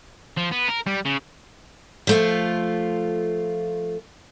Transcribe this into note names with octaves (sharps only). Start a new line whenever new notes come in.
F3
B3
A#4
G3
C#3
F3 A3 F4